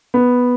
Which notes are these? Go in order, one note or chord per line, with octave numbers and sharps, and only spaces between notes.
B3